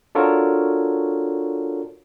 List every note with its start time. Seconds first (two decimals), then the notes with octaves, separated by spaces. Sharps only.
0.15 D4 F4 F#4 A4 A#4 C#5